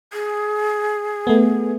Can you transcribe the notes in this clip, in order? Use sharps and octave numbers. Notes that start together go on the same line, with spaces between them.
G#4
A3 B3